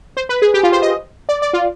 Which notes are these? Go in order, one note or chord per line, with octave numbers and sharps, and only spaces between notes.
C5
B4
G#4
G4
F4
C5
D#5
D5
D5
F4